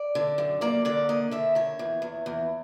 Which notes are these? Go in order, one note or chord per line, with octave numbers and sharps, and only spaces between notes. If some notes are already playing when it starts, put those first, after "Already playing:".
Already playing: D5
D3
F#2
A#3 D5
D3 D5
A#3 D#5
D3 E5
D#3 C#5
E2
E2
E2